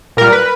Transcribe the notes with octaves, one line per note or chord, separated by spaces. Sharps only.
A#2 G3 A#4
B4